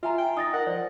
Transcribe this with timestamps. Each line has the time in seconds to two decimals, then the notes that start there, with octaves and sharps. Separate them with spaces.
0.03 F4 E5 G#5 A#5
0.18 G5
0.37 D#4 D#6 A6 A#6
0.54 A#4 F#5
0.67 F3 D5